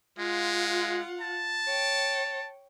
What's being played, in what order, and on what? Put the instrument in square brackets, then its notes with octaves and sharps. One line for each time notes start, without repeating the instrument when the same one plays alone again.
[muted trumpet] G#3 [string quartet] F4 F5 F#5
[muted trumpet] A5
[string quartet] C#5 G5